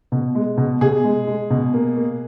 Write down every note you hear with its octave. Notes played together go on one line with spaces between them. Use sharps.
B2
G#3
B2
B2 G#4
G#3
G#3
B2
A#3
A#3